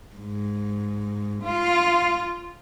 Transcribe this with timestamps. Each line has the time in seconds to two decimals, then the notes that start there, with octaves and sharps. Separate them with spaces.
0.15 G#2
1.43 F4